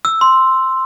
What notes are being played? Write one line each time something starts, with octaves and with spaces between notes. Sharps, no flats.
E6
C6